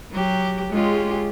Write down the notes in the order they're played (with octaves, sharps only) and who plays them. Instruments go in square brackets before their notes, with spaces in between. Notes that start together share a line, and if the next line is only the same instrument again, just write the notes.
[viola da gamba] F#3 G4
[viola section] G#3 [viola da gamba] C#4 F4 G4